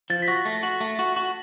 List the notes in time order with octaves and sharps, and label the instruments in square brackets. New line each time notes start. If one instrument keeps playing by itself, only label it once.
[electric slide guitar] F3 [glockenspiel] A6
[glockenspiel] B6
[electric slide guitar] F#4 [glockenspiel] A#6
[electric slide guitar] A3 [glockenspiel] A#6
[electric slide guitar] F#4
A3
F#4
F#4